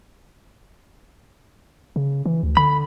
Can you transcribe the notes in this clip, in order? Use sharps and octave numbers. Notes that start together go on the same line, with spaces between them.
C#3
E3
D2
D3 B5